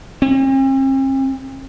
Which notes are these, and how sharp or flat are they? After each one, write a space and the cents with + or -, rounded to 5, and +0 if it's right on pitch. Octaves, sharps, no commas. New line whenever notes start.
C4 +45